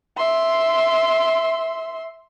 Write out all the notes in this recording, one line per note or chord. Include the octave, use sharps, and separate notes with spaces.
E5 C6